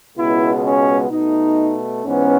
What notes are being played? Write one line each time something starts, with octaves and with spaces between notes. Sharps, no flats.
C#2 B2 G#3 B3 E4
C#4
B2 A3 D#4
G#2 E3 B3 C#4